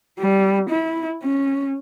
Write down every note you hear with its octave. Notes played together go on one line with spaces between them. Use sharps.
G3
E4
C#4